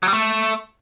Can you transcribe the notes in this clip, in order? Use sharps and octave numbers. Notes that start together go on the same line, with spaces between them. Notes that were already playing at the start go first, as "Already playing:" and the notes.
F#3
G3
A3